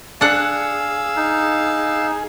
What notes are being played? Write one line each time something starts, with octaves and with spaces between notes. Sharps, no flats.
D4 G#4 F5 F#5 E6
D#4